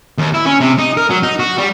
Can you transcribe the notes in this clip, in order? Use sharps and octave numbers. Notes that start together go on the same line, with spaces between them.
D#2
E4
C#4
C3
D#4
A#4
F#3
D#4
F#4
G3